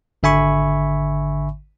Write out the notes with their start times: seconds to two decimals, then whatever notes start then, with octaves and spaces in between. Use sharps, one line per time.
0.23 G#1 D3 E5 G#5 B5 C#6